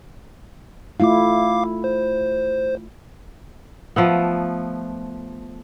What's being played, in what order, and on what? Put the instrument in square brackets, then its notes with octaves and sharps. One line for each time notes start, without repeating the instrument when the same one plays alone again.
[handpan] A3 E4 F4 [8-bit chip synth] F5 D6
[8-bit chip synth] C5
[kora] F3 A3 B3